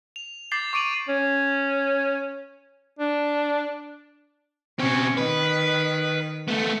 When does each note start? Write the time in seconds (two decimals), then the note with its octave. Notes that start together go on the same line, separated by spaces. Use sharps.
0.16 F7
0.51 D6 G6 A6 C7 F#7 G7
0.73 C#6 D6 D7 D#7 F7 F#7
1.08 C#4
2.99 D4
4.79 B2 C4 C#4
5.17 D#3 B4
6.48 A3 B3